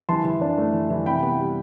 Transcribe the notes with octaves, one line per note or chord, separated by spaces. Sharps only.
E3 A5 C6
E3
D4
A3
E3
E3
C3 G5 B5
B3
G3